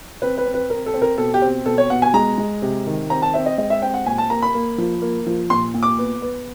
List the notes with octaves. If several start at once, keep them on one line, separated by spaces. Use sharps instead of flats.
C4 B4
B4
C4
B4
C4 A#4
A4
C4
A#4
B2 A4
G4
C4
B2 A4
C#5
B2 F#5
G#5
G#3 A#5
G#3
C3
D#3
C4 A#5
A5
C4 E5
D#5
G#3 D#5
E5
C4 G5
F#5
A#2 G#5
A5
A#3 A#5
B5
A#3
F3
A#3
F3
A#2 C6
A#2
D6
B3
B3